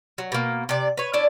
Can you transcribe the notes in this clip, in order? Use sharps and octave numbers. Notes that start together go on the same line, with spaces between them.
F#3
B2 A#3
C3 D5
B4 C#5
C#4 D4 E4 D5